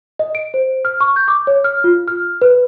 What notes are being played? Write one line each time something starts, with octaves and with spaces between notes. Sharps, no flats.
D#5
D7
C5
F6
C#6
G6
D6
C#5
F6
F4
F6
B4